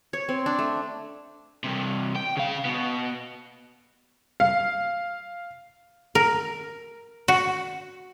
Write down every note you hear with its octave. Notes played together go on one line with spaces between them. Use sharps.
C#5
C4
D4
A3
G2 C3
G5
C#3 F5
B2 B3
F5
A#4
F#4